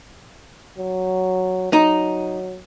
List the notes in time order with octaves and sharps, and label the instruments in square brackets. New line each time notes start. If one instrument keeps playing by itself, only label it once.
[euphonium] F#3
[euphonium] F#3 [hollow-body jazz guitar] D#4